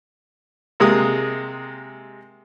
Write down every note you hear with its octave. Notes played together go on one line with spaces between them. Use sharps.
C3 G#3 A#3 D#6